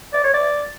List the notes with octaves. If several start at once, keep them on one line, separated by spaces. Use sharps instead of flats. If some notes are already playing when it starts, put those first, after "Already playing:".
D5
C#5
D5